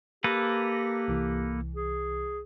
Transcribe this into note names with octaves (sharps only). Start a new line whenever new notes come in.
A#3 G4 A4 B4 A#5 A#6
C2 E3
G#4